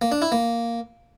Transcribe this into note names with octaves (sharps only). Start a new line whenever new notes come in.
A#3
D4
E4
A#3